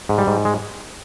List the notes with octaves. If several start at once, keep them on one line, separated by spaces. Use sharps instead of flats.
G#2
G3
G#2
G#3